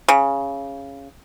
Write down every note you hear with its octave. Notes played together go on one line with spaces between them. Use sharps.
C#3